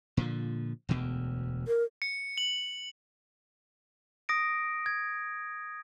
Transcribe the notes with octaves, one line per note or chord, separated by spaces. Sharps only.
A#2 D3 F3
E1 D2 B2
A#4
C#7
F#7
D#6 A#6 D7
G#6